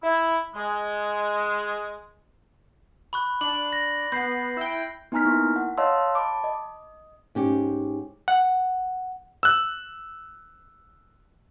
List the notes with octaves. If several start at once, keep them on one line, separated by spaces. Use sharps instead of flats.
E4
G#3
B5 C#6 F#6
D4 F#7
A#6
B3 G6 C7
E4 G5
B3 D#4 G#5 A#5 F6 B6
A#3 E4 C#6
F#5
C#5 D#5 F5 A5 C6 E6
A5 B5 D6
D#5
G#2 C#4 G4
F#5
E6 F#6